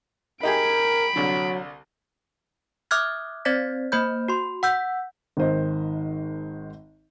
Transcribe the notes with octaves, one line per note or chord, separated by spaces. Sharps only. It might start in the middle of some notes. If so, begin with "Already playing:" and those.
D#4 G4 G#4 A#4 B5 D7
C2 D3 F#3
E5 D6 D#6 F6 F#6 G#6
C4 C5 D5 G#6 A6 B6
A#3 C5 B5 G6
F#4 C6
F#5 E6 G6 B6
G#1 D#3 C5 D#5